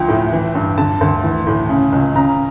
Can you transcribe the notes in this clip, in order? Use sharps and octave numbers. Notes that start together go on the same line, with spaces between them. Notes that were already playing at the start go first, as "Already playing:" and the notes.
Already playing: D2 F3 G5
A2
E3
G2
D3 A5
D2
E3
A2
C#3
C#2
C#3 A#5